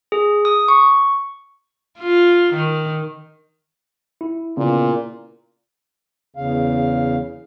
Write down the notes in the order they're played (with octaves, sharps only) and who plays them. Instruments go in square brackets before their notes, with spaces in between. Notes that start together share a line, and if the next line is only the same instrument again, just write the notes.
[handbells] G#4
D#6
C#6
[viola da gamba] F4
D#3
[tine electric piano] E4
[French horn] A#2 [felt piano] C#3 B3
[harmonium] E2 C#3 F5